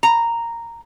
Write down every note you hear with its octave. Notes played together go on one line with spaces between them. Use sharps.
A#5